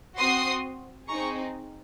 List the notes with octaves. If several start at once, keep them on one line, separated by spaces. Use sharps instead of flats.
C4 F#4 C6 D#6
C4 D#4 G#4 A#5 C#6